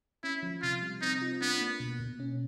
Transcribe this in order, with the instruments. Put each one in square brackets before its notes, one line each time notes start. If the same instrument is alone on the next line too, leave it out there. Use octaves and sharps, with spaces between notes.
[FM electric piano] C#4 [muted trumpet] E4
[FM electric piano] F3
[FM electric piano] C3 [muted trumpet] F4
[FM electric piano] G3
[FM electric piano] C4 [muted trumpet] D#4
[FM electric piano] F4
[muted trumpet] B3 [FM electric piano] D4
[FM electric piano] A#3
B2
B2
C#4